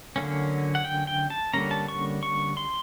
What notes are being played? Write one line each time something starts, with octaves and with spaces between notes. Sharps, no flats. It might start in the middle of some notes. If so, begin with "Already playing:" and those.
D3 F#3 A#3 C#4
F#5
G5
G5
A5
D3 G3 A#3 C#4 A#5
A5
C#6
C#6
C6